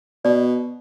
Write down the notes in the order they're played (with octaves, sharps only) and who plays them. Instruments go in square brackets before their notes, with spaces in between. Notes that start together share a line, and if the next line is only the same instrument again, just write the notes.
[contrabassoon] B2 [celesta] D5